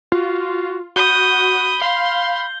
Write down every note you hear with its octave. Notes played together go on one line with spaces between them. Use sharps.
F4 F#4
F#4 B5 D#6 G6 G7
F5 C6